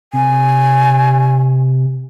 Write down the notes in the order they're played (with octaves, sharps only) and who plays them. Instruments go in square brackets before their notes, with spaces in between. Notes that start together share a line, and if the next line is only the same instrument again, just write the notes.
[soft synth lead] C3 [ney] G#5